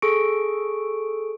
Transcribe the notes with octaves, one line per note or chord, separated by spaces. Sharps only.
G#4 A4 C#6 D7